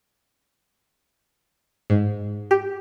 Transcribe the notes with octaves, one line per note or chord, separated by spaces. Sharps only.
G#2
G4